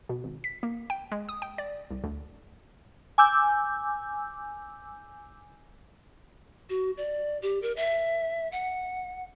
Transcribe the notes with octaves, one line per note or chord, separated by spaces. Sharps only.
B2
G#1
B6
A#3
G5
G#3
D#6
G5
D5
C2
D2
G#5 D6 E6 G6
F#4
D5
G4
A#4
E5
F#5